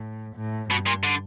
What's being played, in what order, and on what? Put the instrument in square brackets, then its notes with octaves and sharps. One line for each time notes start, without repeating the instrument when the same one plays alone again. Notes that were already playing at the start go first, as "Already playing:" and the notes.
Already playing: [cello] A2
A2
[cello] G2 [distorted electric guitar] B2
[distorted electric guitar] A#2
D3